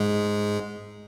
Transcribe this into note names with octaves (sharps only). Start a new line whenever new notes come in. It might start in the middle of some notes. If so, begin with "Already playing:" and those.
Already playing: G#2 G#3